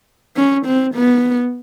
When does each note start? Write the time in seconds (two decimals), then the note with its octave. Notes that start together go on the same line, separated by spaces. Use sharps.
0.37 C#4
0.66 C4
0.95 B3